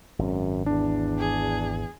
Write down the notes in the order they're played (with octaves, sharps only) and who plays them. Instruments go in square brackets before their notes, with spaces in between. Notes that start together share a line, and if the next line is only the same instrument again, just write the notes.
[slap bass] G#1 [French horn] F#2
[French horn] E2 [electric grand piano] D4
[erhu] G#4